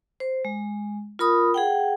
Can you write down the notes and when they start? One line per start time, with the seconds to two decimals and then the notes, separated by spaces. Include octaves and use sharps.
0.20 C5
0.45 G#3
1.19 F4 A#4 B5 D#6
1.54 G#4 F#5 G5